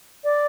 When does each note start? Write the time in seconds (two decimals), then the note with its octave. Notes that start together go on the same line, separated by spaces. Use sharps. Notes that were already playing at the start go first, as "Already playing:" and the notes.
0.24 D5